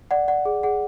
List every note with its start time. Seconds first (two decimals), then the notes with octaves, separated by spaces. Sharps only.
0.11 D5 F#5
0.28 D5 F#5
0.45 G#4
0.63 G#4 F#5